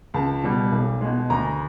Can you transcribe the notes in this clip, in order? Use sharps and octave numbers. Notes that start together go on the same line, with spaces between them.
C#2 A5
B2 G3
B1
B2 G#3
D2 A#5